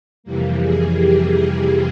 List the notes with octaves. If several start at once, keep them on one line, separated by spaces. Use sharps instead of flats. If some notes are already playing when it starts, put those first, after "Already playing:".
F2 C3 E3 G3 A#3
G#4
G4